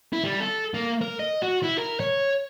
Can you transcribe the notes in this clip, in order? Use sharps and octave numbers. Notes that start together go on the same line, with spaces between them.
E4
G3
A4
A#3
A#4
D#5
F#4
E4
A#4
C#5